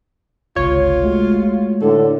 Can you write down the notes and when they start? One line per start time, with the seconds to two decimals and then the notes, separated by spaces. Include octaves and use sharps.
0.56 G1 C#2 C3 F4 C#5
1.03 G#3 A3 F#4
1.81 A2 D3 A4